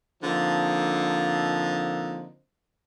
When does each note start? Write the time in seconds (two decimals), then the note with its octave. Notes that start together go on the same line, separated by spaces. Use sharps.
0.22 D3 F3 A#3 C4 D#4